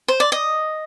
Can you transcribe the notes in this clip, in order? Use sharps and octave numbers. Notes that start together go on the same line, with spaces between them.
C5
D5
D#5